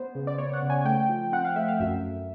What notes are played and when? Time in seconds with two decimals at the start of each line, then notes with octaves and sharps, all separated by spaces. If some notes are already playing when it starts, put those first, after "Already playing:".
Already playing: B3 C5
0.15 C#3
0.27 D5
0.38 B3 C#5
0.53 F#5
0.62 C#3
0.70 G#5
0.85 A3 G5
1.09 F3
1.32 C4 F#5
1.45 F5
1.56 A3 E5
1.68 F5
1.80 F#2 E5
2.03 F#2